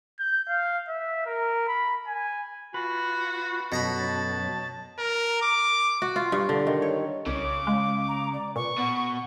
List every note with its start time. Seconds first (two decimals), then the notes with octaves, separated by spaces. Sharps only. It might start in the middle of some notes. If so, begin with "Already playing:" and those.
0.19 G6
0.48 F5
0.89 E5
1.26 A#4
1.68 B5
2.07 G#5
2.74 F4 F#4 B4
3.72 F#2 B2 F#3 B3 A4 A#5 B5
3.95 A5
4.99 A#4
5.42 D6
6.02 F#4
6.16 F4
6.32 G2
6.49 D3
6.67 D#3
6.82 C#5
7.26 C2 C#3 C#5 D6
7.67 G#3 F5
8.08 A#5
8.33 D5
8.56 A#2 B4 C#6
8.78 B2 F#5